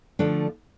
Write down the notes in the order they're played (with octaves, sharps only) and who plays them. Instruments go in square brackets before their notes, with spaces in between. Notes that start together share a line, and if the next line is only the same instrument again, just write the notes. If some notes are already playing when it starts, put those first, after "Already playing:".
[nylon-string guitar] D3 F3 A3 D4